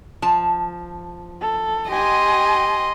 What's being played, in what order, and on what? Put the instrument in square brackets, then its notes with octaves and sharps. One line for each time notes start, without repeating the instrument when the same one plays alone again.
[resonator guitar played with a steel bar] F3 A5
[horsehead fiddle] A4
[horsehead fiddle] G4 G#5 [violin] D#5 C6